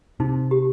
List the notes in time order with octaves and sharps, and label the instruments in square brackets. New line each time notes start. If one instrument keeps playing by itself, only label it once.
[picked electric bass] C3 [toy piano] D#4
[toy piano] G4